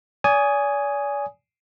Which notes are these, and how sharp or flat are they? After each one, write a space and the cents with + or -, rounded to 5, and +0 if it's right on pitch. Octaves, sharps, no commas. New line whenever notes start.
D5 -40 G#5 +0 D#6 +0